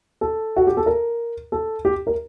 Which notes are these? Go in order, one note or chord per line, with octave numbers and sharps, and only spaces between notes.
A4
F#4
G4
A4
A#4
A4
G4
A#4